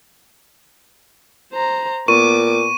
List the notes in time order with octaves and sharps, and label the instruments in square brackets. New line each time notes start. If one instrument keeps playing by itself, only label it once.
[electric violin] C5 A#5
[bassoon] A#2 [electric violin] B3 D6 [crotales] C#6 D#7